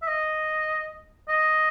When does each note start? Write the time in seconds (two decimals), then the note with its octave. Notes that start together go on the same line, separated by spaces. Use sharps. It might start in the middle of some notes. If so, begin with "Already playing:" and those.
0.02 E5
0.08 D#5
1.29 D#5